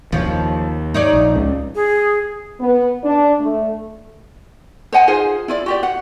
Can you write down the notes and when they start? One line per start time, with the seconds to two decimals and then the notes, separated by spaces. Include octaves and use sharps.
0.12 E1 D#2 F3 C#4
0.26 D#2
0.94 D#4 C#5 D5
1.13 A#1
1.35 C#2 C#3
1.75 G#4
2.60 B3
3.04 D4
3.41 A3
4.92 C5 D#5 F#5 G#5
5.08 D#4 F4 G#4 C5
5.48 E4 F4 D5
5.66 F#4 G4 D5
5.83 F#5